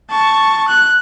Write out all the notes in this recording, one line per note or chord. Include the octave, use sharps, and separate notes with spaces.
A5 C#6
F#6